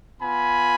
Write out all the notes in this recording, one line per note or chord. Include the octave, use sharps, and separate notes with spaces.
B3 F4 G#5 B5